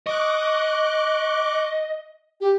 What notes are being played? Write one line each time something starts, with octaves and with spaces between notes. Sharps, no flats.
D#5 C#6 D6 F#6
G4